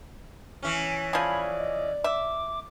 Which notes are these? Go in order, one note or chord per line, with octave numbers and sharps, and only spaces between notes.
E3 C#4
F3 G#4 D5 B5
D#5
E5 D6